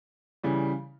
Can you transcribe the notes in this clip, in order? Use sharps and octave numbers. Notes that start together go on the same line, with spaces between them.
C#3 E3 G3